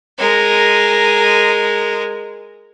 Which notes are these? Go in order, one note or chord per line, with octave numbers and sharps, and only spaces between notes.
G#3 A#4